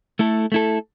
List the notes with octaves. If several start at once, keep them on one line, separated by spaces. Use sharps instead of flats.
A3 E4 A4
A3 E4 A4